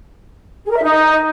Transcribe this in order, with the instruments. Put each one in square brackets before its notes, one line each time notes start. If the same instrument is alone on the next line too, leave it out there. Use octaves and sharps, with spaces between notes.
[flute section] G#4
A#4
E5
D#4